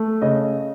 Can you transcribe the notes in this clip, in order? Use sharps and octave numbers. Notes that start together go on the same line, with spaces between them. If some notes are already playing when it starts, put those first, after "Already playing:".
Already playing: A3
C#3 D#5